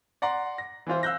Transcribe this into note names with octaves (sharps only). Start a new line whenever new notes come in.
D5 F#5 A#5 C6
A#6
E3 C4 F4 C5
F5 E6 F#6 G6 A#6